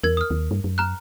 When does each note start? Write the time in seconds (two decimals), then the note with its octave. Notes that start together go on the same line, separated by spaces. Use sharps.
0.03 E2 A#4 G#6
0.17 D#6 F6
0.30 D#2
0.51 G2
0.64 F#2
0.78 A#5 F6 F#6